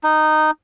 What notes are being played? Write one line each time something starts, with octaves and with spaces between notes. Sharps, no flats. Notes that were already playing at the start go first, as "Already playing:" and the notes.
D#4